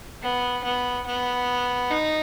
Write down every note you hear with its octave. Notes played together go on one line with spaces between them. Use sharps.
B3
B3
B3
D#4